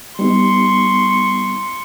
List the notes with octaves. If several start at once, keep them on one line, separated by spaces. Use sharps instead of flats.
G3 B3 D#4 C6 C#6